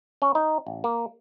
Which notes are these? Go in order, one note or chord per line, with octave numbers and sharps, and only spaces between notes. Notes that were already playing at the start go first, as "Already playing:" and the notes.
C#4
D#4
A1
A#3